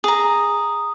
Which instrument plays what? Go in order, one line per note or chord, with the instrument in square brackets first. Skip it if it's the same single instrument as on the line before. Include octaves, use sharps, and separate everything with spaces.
[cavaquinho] G#4 A#5 [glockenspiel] D#6